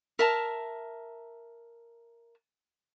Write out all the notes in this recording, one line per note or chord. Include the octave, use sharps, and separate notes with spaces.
A#4 E5 A5 A#5